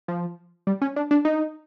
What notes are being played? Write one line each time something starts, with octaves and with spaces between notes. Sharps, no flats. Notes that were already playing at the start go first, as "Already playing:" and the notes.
F3
G3
C#4
D4
D4
D#4